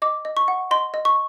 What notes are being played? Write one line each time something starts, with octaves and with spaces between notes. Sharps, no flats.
D#5 D6
D#5
C#6
F#5
D#5 C6
D#5
C#6